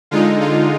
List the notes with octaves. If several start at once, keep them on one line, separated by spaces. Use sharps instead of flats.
D3 G#3 D#4 F4
F4